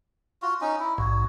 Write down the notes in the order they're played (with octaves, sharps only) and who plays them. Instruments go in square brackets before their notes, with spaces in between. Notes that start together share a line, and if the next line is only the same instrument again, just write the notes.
[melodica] F4 F#4
C#4 D#4
E4
[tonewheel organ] A#1 G#2 [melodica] F#4